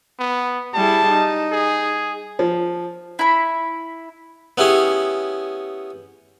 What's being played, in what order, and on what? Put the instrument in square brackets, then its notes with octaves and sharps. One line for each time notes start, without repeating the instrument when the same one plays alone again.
[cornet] B3
[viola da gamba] G3 E4 G#4 [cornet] A5
[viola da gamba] D#4
[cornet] G#4
[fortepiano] F3
[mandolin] E4 B5
[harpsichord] B3 C#4 E4 G4 G#4 C#5